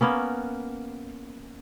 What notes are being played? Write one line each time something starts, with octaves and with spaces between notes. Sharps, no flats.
A#3 B3 C#4